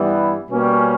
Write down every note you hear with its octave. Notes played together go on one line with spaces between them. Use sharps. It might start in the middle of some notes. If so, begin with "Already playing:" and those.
Already playing: G2 E3 G3 B3 E4
B2 G3 A#3 C#4